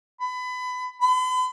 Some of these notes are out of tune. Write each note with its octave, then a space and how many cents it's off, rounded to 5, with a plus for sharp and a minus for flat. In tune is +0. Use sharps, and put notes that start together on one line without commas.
B5 +25
B5 +45